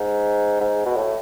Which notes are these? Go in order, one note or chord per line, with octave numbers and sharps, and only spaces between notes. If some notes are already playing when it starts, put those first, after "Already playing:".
Already playing: G#2
G#2
B2
A2